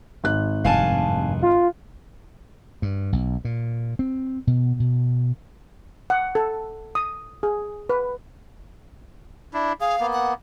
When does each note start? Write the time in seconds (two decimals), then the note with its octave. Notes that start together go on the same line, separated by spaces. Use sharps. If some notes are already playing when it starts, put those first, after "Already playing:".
0.24 G#1 F#6
0.64 F1 G2 F5 G#5 A5
1.42 F4
2.82 G2
3.13 B1
3.45 A#2
3.99 C4
4.47 B2
4.80 B2
6.10 F#5
6.35 A4
6.95 D#6
7.43 G#4
7.89 B4
9.54 D4 E4
9.81 G#4 F5
10.00 A#3 B3
10.13 F#5